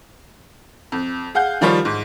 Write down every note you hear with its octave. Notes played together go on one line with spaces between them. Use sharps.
F2
G#4 F5 F#5 G6
D#3 F3 G3 F4 C#5
G#2